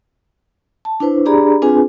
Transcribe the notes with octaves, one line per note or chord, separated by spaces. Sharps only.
A5
D4 E4 B4 C5
D4 G4 G#4 D5 A#5 B5
C4 D4 F4 G#4 B4 G#5